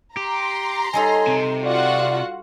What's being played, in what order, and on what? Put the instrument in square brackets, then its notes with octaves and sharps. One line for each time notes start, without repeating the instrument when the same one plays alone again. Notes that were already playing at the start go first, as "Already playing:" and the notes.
[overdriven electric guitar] G4 [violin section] A#5 C6
[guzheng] G3 D#4 A4 [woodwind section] C#5 D#5 G#5
[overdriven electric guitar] C3
[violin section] F4 F#4 F#5 [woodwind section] D5